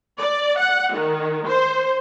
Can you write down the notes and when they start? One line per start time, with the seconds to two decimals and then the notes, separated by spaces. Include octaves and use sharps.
0.18 D5
0.58 F#5
0.93 D#3
1.46 C5